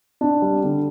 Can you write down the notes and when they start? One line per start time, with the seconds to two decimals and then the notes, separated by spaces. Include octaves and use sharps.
0.21 D4
0.42 G3
0.63 D3